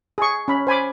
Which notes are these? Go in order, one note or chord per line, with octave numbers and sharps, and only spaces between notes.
G#4 C#6
C#4 B5
C5 G#5 B5 D6